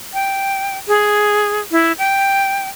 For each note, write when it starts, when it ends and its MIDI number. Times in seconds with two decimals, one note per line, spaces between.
0.14 0.78 79
0.88 1.61 68
1.72 1.92 64
1.98 2.69 79